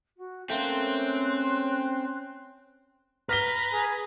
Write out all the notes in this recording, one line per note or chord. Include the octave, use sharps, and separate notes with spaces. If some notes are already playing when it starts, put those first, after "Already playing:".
F#4
A3 A#3 C4 C#4 C6 F#6
B4 A#5 F6 B6 G7
G#4